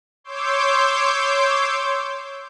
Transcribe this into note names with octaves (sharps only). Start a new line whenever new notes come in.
C#5 C6 D6 E6 G6